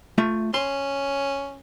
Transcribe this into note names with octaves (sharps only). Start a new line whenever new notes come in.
A3 F4 E5
C#4 C6